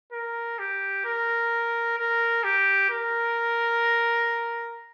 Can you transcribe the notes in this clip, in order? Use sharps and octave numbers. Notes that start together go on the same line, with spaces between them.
A#4
G4
A#4
A#4
G4
A#4